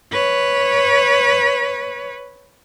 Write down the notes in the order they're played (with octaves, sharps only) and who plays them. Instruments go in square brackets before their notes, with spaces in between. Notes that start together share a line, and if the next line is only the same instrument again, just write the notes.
[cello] B4 C#5